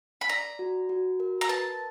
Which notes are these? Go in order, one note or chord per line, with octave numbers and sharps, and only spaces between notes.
B5
D5 A#5
F#4
F#4
A#4
A#5
B4 A5